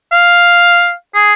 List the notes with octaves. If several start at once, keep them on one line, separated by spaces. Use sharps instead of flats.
F5
G#4